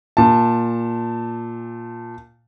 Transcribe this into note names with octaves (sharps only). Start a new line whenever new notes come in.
A#2 A5